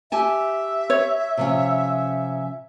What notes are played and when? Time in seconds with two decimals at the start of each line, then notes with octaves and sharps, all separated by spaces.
0.12 G4 E5 G#5 A5
0.90 C#5
1.37 C3 F3 C#4